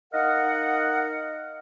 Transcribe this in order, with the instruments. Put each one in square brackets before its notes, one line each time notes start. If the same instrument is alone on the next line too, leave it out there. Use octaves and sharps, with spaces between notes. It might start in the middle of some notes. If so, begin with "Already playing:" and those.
[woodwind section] D#4 A#4 D#5 F5 F#5